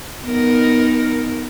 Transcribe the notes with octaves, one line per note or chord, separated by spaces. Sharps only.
B3 D#4 A#4